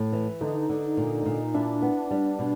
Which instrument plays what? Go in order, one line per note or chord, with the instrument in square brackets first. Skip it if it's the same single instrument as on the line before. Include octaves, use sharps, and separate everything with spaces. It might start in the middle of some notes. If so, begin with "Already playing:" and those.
Already playing: [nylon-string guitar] A2
E3
[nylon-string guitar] D3 [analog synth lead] D#4
[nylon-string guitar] D3
A#2
A#2
[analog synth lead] D4 [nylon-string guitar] E4
[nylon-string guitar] B3
G3
B2